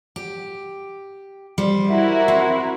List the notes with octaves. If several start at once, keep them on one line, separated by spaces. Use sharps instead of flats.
G4
G3 C5
E4 F#4 A#4
C4